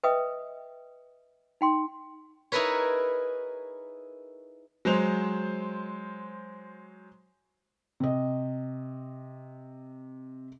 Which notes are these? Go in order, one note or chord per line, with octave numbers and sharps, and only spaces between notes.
B4 D#5 E5 G5 D#6
D#4 G5 C6
D#4 E4 G#4 A#4 B4 C#5
F#3 G#3 C5 F7
C3 D#5